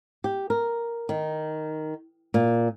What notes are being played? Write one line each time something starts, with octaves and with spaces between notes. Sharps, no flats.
G4
A#4
D#3
A#2